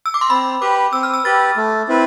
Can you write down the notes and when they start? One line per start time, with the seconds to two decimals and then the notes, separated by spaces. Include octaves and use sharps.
0.06 E6
0.14 D6
0.21 C6
0.30 C4 B5
0.61 G4 B4 D6
0.93 C4 E6
1.03 F6
1.13 E6
1.24 G4 B4 A6
1.57 A3
1.88 C4 E4 B4